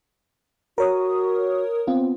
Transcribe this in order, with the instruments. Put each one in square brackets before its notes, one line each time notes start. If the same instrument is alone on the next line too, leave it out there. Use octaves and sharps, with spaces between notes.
[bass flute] F#4 [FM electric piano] A#4 C#5 D#6
[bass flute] B3 [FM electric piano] C4 F4